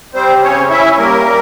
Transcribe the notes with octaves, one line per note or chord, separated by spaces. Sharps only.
G3 C4 C5
C#3 C#4 C#5
C#4 E4 E5
G3 A#3 A#4
G3